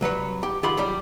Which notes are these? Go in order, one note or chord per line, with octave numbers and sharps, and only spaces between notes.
C2 F#3 B4 C#5
G4
D#3 F4 G4 F#5 B5 C6
F#3 G3 G4